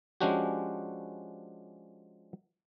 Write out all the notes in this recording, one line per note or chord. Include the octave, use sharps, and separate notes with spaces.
F3 G#3 C#4 D4 F#4 G4